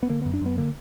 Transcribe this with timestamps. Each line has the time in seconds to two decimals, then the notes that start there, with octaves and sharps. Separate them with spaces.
0.03 B3
0.09 D3 A#3
0.22 F#2 B3
0.34 D4
0.41 F#2 B3
0.58 D3 A#3